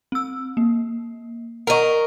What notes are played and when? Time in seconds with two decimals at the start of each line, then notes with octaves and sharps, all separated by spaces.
0.12 C4 E6
0.57 A#3
1.67 A#4 D#5 F#5 A#5 C#6